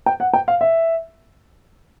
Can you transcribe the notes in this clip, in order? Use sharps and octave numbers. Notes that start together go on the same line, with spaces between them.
G5
F#5
G5
F5
E5